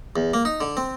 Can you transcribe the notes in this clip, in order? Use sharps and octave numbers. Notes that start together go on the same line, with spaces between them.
E2
A#3
D#4
D3
C4